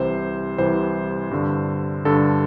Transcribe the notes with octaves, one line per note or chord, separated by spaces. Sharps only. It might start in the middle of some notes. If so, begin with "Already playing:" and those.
Already playing: C2 C3 E3 C5
C2 C3 E3 C5
G2 D3
G2 D3 A4